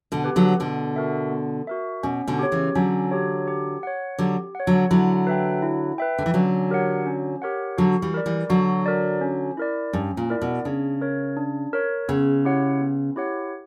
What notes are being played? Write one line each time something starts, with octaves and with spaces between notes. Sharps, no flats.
B2 D3
G4 B4
D3 F#3
B2 D3 B3
F#4 A#4 E5
B3
F#4 A#4 E5
B2 C#4
B2 D3
G4 C#5
C#3 E3
D3 F#3 C#4
G4 C#5
G4
C#5 F#5
D3 F#3 G4
C#5 F#5
D3 F#3
D3 F#3 E4
B4 E5 G5
E4
B4 E5 G5
D3
E3
D3 F#3 C#4
G4 A#4 C#5 F#5
C#4
G4 A#4 C#5 F#5
D3 F#3 F#4
E3 G3
A#4 D5
E3 G3
D3 F#3 F#4
A#4 D5
C#4
E4 A#4 D5
G2 C#4
A#2
E4 A#4 D5
B2
C#3 D4
A#4 C#5
D4
A#4 C#5
C#3 B3
E4 G4 C#5 F#5
B3
E4 G4 C#5 F#5